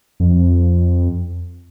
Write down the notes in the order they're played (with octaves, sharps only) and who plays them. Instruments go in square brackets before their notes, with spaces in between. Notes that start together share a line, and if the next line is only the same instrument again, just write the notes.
[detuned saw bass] F2